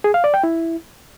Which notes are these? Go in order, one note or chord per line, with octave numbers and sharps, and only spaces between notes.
G#4
F5
D5
G5
E4